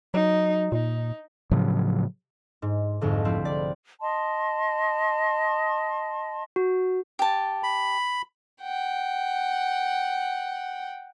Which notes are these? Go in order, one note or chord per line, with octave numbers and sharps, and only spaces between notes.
F#3 D#4
A#2 D#4
A2 C#3 F3 F#3
G#2
C2 F2 G#2 D3
F3 A3 C4 E4
D5
D#5 A5 C6
F#4
G4 A5
B5
F#5 G5